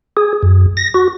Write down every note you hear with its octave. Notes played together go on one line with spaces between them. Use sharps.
G#4
F#2
A#6
F#4